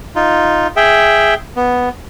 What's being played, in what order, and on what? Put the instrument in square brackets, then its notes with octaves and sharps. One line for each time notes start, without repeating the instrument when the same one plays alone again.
[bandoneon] D#4 F4
G#4 E5 G5
B3